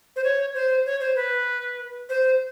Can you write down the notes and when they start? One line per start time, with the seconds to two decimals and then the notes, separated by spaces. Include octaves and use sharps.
0.16 C5
0.24 C#5
0.55 C5
0.86 C#5
1.00 C5
1.16 B4
2.09 C5